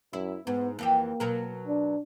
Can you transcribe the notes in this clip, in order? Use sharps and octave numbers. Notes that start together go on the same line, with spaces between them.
F#2 E4
G#2 B3
F2 E3 A#3 G4
B2 F#3 A#4
D4